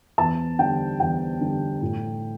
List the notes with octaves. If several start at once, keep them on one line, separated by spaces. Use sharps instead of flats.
E2 A5
D3 G3 G5
E2 G5
D3 G3
A2